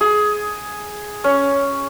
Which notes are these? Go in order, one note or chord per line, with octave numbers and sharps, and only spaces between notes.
G#4
C#4